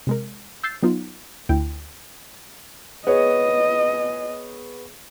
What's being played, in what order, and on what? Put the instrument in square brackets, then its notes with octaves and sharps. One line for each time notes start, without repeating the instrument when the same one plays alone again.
[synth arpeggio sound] C3 G#3 A#4
E6 G6 A6 C7
F#3 B3 D#4 F4
D2 E4 G5
[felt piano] B3 G#4 C#5 [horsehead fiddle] D#5